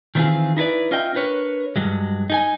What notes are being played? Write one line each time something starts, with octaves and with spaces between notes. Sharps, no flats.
D#3 E3 B3 C4 F4 G#4
D#4 E4 A4 B4 D5
C#4 F4 D#5 E5 G5
D4 A#4 B4 C#5
G2 F#3 G#3
D#4 G#4 G#5